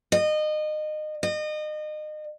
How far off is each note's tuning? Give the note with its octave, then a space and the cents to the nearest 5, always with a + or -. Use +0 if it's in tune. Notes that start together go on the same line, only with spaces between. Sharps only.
D#5 -25
D#5 -30